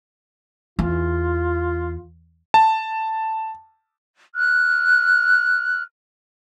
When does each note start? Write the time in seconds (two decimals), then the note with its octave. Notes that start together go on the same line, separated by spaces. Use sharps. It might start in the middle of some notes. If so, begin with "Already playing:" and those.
0.79 E2 F4
2.54 A5
4.34 F6 F#6